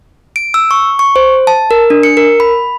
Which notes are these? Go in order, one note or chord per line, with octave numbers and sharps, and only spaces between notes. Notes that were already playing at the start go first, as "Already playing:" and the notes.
D7
E6
C#6
C#6
C5
A5
A#4
D4
C#7
A#4
B5